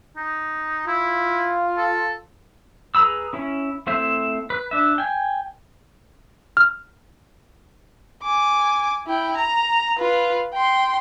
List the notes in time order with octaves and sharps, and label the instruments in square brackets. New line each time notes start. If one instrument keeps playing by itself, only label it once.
[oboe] D#4
[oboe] E4 [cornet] F4
[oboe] A4
[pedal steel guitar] G#4 B4 A#5 B5 E6
C#4 E4
A3 C4 E4 C5 E5
B4
D4 E5
G5 G#5
[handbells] F6
[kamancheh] G#5 D6
E4 G5
A#5
F4 B4
G5 C6